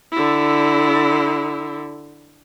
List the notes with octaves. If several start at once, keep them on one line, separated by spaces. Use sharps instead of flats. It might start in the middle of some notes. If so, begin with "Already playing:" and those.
D3 E4